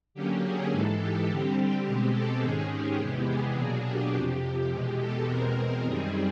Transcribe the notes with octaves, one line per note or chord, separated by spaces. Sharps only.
D3 F#3 A#3 C#4 G4
G#4
G#2 E3 G#3 A4
G4
D3 G3 C4 G4
B2 G#3 C4 G4
A4
G#2 D#3 G#3 C#4 G#4
G4
E2 C3 E3 G#3 B3
G#4
B2 F#3 A#3 D4
G4
F2 C3 F3
E2 B2 G#3 G4
A4
E2 B2 G#3 C4 A#4
F#2 D#3 G3 C4 G#4